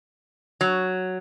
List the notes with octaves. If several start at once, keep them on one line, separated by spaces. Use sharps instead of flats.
F#3